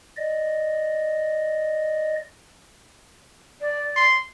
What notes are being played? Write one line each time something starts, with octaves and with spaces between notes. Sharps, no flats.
D5 D#5
D5
C6